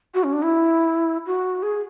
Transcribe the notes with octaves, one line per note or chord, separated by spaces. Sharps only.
F#4
C#4
D4
E4
F#4
G#4